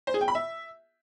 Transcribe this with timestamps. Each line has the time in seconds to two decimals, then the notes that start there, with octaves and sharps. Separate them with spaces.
0.07 C5
0.14 G#4
0.21 G5
0.28 B5
0.35 E5